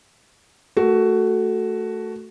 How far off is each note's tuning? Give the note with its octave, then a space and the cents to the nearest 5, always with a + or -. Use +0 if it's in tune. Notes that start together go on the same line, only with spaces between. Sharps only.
A3 +0 F#4 +10 A#4 +10